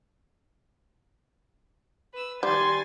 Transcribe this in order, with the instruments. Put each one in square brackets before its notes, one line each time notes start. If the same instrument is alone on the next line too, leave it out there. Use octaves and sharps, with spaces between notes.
[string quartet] B4 E6
[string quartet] D#3 G#5 A6 [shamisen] G3 [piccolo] C6